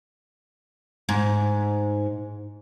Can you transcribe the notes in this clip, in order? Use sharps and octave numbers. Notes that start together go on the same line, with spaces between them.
G#2